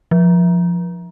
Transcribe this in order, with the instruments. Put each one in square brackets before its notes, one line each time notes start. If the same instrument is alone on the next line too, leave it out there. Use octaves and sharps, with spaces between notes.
[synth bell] F3